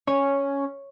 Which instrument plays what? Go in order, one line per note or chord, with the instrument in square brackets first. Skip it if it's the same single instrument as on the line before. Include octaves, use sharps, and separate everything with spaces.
[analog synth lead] C#4 [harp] C#5